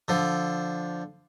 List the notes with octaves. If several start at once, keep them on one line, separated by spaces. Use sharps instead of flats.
D3 F3